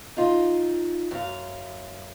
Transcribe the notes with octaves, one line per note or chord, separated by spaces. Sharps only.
D#4 F4
F#2 F5